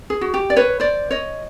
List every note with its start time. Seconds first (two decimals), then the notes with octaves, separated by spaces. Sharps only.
0.10 G#4
0.21 F#4
0.34 G4
0.50 D5
0.56 B4 C#5
0.80 C5 D5
1.11 C#5 D#5